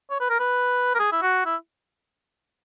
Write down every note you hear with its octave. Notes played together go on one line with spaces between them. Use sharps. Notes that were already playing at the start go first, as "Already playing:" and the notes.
C#5
B4
A#4
B4
A#4
G#4
E4
F#4
E4